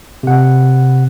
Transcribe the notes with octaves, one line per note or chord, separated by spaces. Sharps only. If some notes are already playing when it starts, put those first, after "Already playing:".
C3 F#5